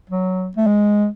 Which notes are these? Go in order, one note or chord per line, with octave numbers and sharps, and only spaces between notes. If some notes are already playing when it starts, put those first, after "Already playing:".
F#3
A3
G#3